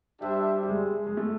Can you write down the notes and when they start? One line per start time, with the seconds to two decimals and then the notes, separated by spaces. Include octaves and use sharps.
0.21 G3 D4 G4 C5 E5
0.63 G3
0.69 G#3
1.07 G#3
1.17 A3